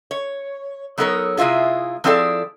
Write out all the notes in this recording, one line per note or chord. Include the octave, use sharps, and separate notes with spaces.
C#5
F#3 B3 D#4 A4 A#4 C#5
C3 G#3 E4 F4 G#4
F3 C4 E4 G#4 A4 D5